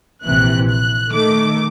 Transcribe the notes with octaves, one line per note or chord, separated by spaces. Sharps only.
A#1 C3 E3 F#6
F#6
D#3 A3 D6